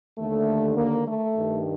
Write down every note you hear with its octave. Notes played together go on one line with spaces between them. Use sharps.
D#2 D3 A3
A#3
A3
G2 D#3